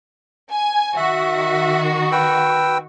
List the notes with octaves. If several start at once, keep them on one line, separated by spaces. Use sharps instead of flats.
G#5
D#3 F#4 E5
B4 G5 E6